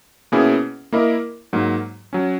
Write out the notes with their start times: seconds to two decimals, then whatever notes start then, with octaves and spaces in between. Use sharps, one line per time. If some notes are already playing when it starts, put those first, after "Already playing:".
0.32 B2 A#3 C#4 E4 G#4
0.92 A#3 E4 A#4 D#5
1.53 G#2 F#3 A#3
2.13 F#3 C#4